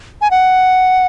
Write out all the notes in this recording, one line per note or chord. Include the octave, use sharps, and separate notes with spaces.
G#5
F#5